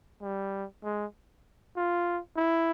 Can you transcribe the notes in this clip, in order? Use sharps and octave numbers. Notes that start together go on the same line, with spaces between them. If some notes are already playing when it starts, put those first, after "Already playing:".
G3
G#3
F4
E4